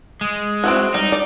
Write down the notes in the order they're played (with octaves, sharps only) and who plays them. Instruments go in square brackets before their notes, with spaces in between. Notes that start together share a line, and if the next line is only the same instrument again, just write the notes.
[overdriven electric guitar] G#3
[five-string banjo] C4 E4 F#4
[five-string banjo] G3 [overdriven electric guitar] D#4
[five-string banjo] D5